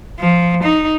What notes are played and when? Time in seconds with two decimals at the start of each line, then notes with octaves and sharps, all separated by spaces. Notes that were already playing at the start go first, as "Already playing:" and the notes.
0.20 F3
0.63 D#4